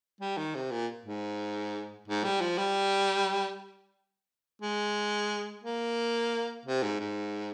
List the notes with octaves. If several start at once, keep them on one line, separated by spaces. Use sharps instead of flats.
G3
D#3
C3
A#2
G#2
G#2
G3
F3
G3
G#3
A#3
C3
G#2
G#2